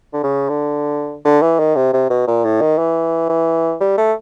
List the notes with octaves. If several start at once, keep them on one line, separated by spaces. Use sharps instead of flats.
D3
C#3
D3
D3
E3
D#3
C3
C3
B2
A#2
A2
D#3
E3
E3
G3
A3